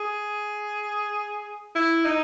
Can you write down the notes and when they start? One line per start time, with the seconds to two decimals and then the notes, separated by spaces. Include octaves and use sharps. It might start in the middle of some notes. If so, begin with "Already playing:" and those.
Already playing: G#4
1.75 E4
2.05 D#4